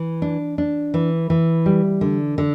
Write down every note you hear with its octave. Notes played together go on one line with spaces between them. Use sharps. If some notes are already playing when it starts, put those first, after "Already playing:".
Already playing: E3
D4
D4
E3
E3
G3
D3
D3